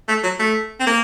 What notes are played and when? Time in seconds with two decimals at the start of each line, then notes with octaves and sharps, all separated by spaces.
0.08 A3
0.23 F#3
0.39 A3
0.80 C4
0.87 A#3